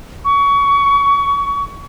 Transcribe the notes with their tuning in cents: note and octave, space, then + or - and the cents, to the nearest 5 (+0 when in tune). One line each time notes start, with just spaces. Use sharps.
C#6 +25